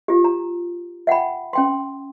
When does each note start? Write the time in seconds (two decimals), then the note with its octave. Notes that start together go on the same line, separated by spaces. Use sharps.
0.08 F4 G4
0.24 A#5
1.07 E5 F#5 G5 B5
1.53 C#4 G5 C6